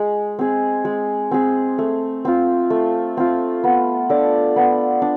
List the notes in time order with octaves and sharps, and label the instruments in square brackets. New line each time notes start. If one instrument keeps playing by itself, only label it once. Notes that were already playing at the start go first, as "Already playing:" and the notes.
Already playing: [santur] G#3
C4 G#4
G#3
C4 G#4
A3
C4 F4
A3
C4 F4
B3
D4 A4 D5
B3
D4